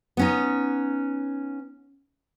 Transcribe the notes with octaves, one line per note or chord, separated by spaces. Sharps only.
B3 C#4 D#4